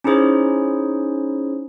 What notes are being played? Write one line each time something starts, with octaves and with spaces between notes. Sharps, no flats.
C#4 D#4 E4 G#4 C5 C#5